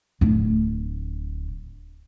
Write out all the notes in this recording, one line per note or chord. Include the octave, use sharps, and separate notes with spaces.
D1 D4